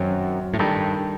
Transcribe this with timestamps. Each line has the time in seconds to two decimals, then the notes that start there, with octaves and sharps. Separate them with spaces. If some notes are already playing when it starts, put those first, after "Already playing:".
Already playing: F#2 D#3 F#3 C4 F#4
0.54 A2
0.59 G2 D#3 G3 D#4 A4